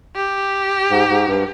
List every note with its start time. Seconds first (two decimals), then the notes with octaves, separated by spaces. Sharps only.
0.16 G4
0.90 G#2
1.09 G#2
1.27 G2